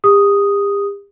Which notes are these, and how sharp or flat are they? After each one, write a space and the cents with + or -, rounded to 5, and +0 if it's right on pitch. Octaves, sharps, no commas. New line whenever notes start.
G4 +40 D#6 +0